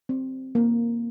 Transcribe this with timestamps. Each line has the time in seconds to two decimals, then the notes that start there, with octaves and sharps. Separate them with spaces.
0.09 C4
0.55 A#3